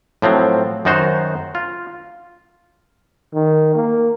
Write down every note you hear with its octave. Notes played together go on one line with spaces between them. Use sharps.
A2 F3 F#3 C4
F#2 D#3 D#4 F#4 C5
F4
D#3
A#3